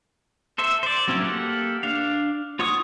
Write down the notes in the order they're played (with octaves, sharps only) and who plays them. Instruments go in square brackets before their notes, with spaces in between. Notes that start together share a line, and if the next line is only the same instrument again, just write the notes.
[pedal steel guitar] A4 C5 E5
C5 D5
F#3 C4 C#4 E4
A#3 G4 A4 F#5
D4 F5
F4 C#5 F#5 C#6 D#6